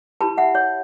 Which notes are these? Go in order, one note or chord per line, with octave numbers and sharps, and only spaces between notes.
E4 G4 B4 A5 B5
E5 F#5
C#5